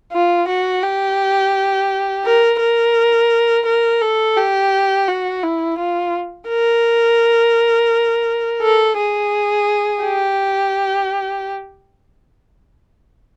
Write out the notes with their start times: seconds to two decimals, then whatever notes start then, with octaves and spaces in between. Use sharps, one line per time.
0.12 F4
0.48 F#4
0.83 G4
2.24 A#4
2.60 A#4
3.66 A#4
4.01 A4
4.37 G4
5.08 F#4
5.43 E4
5.79 F4
6.49 A#4
8.62 A4
8.97 G#4
10.03 G4